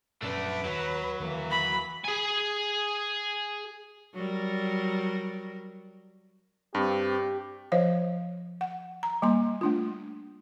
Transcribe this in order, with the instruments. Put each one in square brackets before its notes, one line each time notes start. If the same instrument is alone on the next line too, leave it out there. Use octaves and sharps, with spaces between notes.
[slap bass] A#1 F#2 C#4 [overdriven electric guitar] A3 D4 [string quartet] B4
[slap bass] D#2 [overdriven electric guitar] F#3
[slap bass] D#2 D3 [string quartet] E3 A#3
[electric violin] B5
[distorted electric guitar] G#4 G#5
[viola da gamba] F#3 G3 A#4
[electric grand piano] G2 [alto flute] C4 [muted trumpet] G4
[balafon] F3 C5 C#5 F5
F#5
A#5
G3 A#3 C6
A3 D4 F4